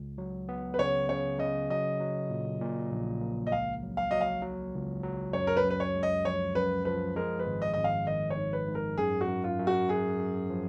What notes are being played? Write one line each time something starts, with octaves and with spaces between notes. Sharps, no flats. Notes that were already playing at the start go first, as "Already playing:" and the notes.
Already playing: C#2
F#3
B3
B4
C#3 C#5
C#3 C#5
C#3 D#5
F#3 D#5
F#3
A#2
A#2
A#1
A#3
D#5
C#2 F5
F#3
F5
F#3 D#5
F5
F#3
C#2
F#3
F#2 C#5
A#4
B4
F#2
B4
C#5
G#3
D#5
F3 C#5
F#2 B4
F3 B4
G#3 A#4
B4
G#1
D#5
G#1 D#5
F5
D#3 D#5
C#5
G#2
B4
G#2
A#4
F#2 G#4
F#4
F#2
F4
F#2
F#4
F#2 G#4
F#2
F3